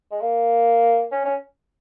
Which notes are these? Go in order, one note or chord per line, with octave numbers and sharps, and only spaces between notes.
G#3
A#3
C#4
C#4